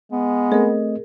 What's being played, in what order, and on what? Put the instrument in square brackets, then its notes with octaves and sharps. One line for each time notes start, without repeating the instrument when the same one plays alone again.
[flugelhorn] G#3 [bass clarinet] B3
[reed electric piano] A3 C4 D#5 [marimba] G#4 A#4